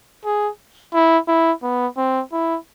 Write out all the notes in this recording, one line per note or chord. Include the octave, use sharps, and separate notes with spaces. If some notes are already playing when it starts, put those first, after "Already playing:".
G#4
E4
E4
B3
C4
E4